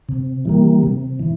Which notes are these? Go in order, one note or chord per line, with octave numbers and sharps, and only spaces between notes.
C3
E3 G3 A#3
C3
E3